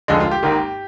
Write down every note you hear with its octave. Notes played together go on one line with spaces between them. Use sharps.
F1 D#2 D3 F3 G#3 D#4
F4
G4
G#1 G#2 D#3 A#3